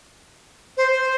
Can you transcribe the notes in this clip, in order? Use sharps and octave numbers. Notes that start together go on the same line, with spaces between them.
C5
C5